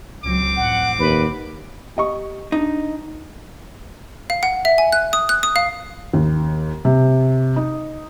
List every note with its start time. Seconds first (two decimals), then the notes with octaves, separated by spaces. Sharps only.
0.24 C#2 F#3 C4 D6
0.57 A1 F2 F#5
0.99 D#2 B4
1.97 G4 D#5 C#6
2.52 D4 D#4
4.30 F5
4.43 F#5
4.65 E5
4.78 G#5
4.92 F#6
5.13 D#6
5.29 F#6
5.43 D#6
5.56 F5
6.13 D#2
6.85 C3
7.56 D#4